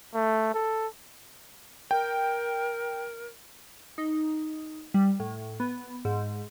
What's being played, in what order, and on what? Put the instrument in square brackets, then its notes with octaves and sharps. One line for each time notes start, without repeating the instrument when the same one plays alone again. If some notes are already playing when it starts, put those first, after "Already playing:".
[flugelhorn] A3
A4
[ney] A#4 [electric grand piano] G5
[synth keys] D#4
G3
A2
B3
G#2